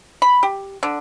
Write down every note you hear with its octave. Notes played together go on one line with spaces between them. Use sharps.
B5
G4
D3